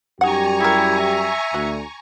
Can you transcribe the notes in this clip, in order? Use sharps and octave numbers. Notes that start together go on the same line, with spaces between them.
F#2 G3 D#4 G4 F#5 G#5 A#5 C#6
E4 G#4 A#4
E5
D2 F#4